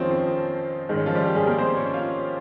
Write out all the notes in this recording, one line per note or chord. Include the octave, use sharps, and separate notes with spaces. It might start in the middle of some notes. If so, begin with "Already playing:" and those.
Already playing: F2 D#3 F3 G#3 C4 C#4 D#4 F4
C4
G#2 D#3 G#3
C#4
F3 F4
G3 G4
G4
G#3 G#4
A#3 A#4
C4 C5
C#4 C#5
F4 F5